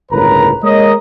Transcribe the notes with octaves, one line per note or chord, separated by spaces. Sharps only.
G1 C#2 A2 A#4 B4 A#5
G#3 A#3 A#4 C#5 D#5